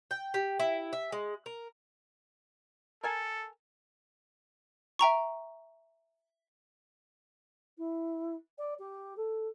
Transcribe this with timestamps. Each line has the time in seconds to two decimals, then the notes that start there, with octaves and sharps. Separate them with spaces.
0.11 G5
0.34 G4
0.59 E4
0.93 E5
1.12 G#3
1.46 A#4
3.03 A4 A#4 G#5 A5
4.99 E5 G5 A#5 C#6
7.78 E4
8.58 D5
8.79 G4
9.17 A4